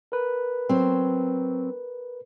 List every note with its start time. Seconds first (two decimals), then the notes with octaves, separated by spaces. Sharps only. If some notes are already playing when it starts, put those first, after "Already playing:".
0.12 A#4 B4
0.69 F#3 C4